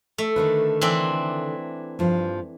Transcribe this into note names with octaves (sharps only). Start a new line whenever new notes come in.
A3
D3 D#3 B4
E3 C4 D4
G2 F3